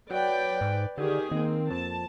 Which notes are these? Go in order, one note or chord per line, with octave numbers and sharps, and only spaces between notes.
F#3 B4 D5 G5
G#2
D3 D#3 G4 G#4
D#3 A#3 C4
F2 A5